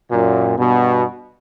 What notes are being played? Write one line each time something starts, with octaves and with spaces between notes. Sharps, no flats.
F#2 A#2
G2 B2